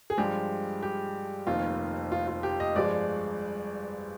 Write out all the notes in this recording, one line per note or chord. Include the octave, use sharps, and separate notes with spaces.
G#4
G2 F3 G#3 G4
G4
F1 F2 D#3 A#3 F4
F4
F4
G4
D#5
G1 G2 F3 G#3 D5